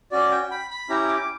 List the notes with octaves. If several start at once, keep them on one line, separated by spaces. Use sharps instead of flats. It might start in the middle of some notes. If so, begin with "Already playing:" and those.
C#4 F#4 D5
G5
B5
B5
C#4 E4 G4 A#5
D6